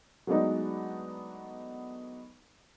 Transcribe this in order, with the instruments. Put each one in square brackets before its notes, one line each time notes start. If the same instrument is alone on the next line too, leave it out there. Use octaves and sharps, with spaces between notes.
[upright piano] F#3 G#3 A3 B3 D4 D#4